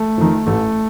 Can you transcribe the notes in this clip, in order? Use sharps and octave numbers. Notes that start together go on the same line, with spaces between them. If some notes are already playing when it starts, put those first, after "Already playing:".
Already playing: A3
F2 D#3
A1 A3